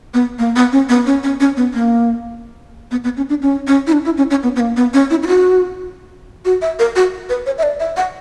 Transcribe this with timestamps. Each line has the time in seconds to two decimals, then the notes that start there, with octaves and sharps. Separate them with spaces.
0.14 B3
0.39 A#3
0.56 B3
0.72 C#4
0.89 B3
1.06 C#4
1.23 C#4
1.40 C#4
1.57 B3
1.74 A#3
2.91 B3
3.04 B3
3.17 C#4
3.29 D4
3.42 C#4
3.67 C#4
3.87 E4
3.93 D4
4.05 E4
4.18 C#4
4.30 C#4
4.43 B3
4.56 B3
4.60 A#3
4.77 B3
4.94 C#4
5.10 E4
5.23 E4
5.27 F#4
6.45 F#4
6.62 E5
6.79 A#4
6.96 F#4
7.30 B4
7.46 C#5
7.58 E5
7.63 D5
7.80 E5
7.97 F#5